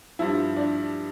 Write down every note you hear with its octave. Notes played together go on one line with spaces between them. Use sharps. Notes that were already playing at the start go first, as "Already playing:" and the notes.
G2 F3 E4
D4